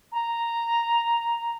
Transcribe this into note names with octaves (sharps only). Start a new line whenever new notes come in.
A#5